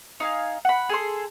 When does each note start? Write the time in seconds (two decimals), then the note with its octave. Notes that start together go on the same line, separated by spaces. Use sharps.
0.20 D#4 F5 G#5
0.65 F#5 B5
0.89 G#4 A4 C6